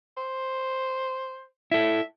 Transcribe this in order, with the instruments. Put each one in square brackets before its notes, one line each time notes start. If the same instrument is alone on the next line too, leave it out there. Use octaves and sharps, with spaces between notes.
[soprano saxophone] C5
[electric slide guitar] E4 A4 [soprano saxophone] E5